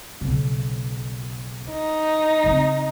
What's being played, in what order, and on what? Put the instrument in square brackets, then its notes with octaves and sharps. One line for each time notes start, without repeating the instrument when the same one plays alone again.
[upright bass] B1 C#3
[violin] D#4
[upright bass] C#3 C4